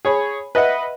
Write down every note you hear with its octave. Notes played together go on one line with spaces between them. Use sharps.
G#4 C#5 B5
B4 D#5 E5 F#5